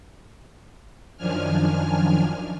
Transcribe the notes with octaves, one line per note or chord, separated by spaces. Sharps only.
F#2 D#3 F3 D4 G#5 F6